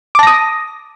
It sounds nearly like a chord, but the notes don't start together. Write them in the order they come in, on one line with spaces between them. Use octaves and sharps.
D6 A5 A#6 D#6